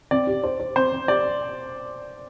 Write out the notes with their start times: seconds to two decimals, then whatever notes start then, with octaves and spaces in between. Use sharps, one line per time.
0.11 C4 D5
0.27 G4
0.44 C5
0.60 C5
0.76 C4 C5
0.92 C4
1.08 G4 D5